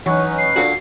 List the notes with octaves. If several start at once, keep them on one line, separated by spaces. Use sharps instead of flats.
E3 F#3 C#4 D#4 B4 C#6
C7
A#2 D3 A#3 F#4